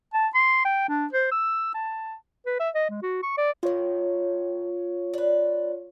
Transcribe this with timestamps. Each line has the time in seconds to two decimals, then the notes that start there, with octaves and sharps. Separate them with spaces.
0.14 A5
0.35 C6
0.65 G5
0.89 D4
1.13 C5
1.31 E6
1.74 A5
2.46 B4
2.60 E5
2.75 D#5
2.90 G#3
3.03 F#4
3.23 C#6
3.38 D5
3.63 A2 D#3 F4 C#5
5.14 D4 B4